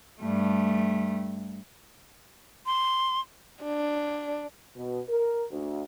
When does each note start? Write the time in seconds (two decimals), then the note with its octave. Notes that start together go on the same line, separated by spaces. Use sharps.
0.20 G2 A3
2.66 C6
3.64 D4
4.77 B2
5.09 A#4
5.52 D2